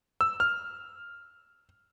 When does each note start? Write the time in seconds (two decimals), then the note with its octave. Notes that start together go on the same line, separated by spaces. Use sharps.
0.21 E6
0.40 F6